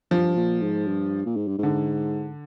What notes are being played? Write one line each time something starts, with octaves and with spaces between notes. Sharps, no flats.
G2 F3
A#2
G#2
G2
A#2
G#2
G2
G#2 D3